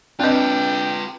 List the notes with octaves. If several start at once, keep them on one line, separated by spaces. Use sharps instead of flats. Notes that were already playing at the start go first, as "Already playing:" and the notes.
C4 D4 F4 B4 D#5 G5 G6